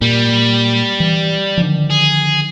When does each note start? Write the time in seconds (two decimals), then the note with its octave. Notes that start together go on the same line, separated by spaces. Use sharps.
0.01 A#2 G3
1.00 E3
1.57 D3 D#3 F3
1.90 G#4